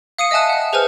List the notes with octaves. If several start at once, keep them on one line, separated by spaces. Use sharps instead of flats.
F5 D#6 C#7 D#7
D#5 E5 G#5 A5 F#6
F#5 F#6
G#4 B4 C5 G#5 F6